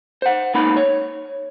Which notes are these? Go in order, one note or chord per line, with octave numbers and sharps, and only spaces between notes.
C5 F#5
C#2 A#3 B3 D#4 B4 B5
C#5